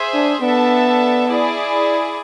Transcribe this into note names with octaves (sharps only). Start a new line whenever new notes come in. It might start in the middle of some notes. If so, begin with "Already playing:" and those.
Already playing: G#4 C5 E5
D4
B3 D4 A4 E5 A5
E4 G#4 D5